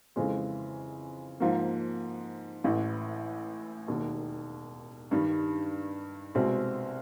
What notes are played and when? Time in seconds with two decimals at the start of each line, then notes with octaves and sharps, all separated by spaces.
0.16 F2 C#3 E3 G#3 C4
1.40 G#2 F3 A#3
2.64 A1 A2 E3
3.88 E1 D#2 D#3
5.11 G2 D#3 G3
6.35 C2 B2 G#3 C4